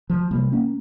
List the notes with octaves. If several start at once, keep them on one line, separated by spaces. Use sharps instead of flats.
F3
C3 G3 A#3
A#3 C#4